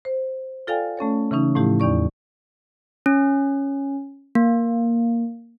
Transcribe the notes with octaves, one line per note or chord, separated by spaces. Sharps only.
C5
F4 A4 D5 F5 G5 G#5
A3 C#4 A4 C#5
C#3 E3 C#4 D#4
A2 F3 A3 E4 G4
E2 D#4 D5 C#6
C#4
A#3